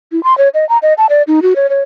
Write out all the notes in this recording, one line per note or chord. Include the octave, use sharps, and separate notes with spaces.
E4
C6
C#5
D#5
A#5
D#5
A5
D5
D#4
F#4
C#5
C#5